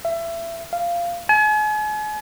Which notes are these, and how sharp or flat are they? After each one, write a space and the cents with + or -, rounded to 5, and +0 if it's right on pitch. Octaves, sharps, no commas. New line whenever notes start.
E5 +25
F5 -15
G#5 +40